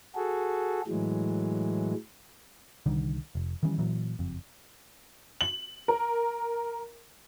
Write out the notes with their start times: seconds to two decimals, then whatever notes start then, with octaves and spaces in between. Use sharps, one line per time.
0.16 F#4 G#4 A4
0.87 A2 E3 F#3 G#3
2.86 C2 D3 D#3 G3
3.35 F1
3.63 D#3 E3 G3 C#4
3.78 A#2 E3 F#3
4.19 F#1 F2
5.41 F#7
5.88 A#4